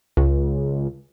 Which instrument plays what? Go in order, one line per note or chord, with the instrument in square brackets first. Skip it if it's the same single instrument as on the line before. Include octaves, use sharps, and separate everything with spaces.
[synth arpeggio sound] C#2